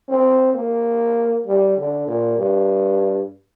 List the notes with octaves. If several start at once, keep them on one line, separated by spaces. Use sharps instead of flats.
C4
A#3
G3
D3
A#2
G2